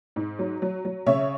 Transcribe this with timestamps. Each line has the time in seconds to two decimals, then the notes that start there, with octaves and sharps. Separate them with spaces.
0.16 G#2
0.39 F#3
0.62 F#3
0.85 F#3
1.06 C#3 C#5 E5